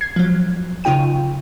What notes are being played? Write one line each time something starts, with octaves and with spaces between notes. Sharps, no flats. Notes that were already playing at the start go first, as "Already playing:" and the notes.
G#6 C7
F3 F#3
C#3 D#4 F4 G5 D#7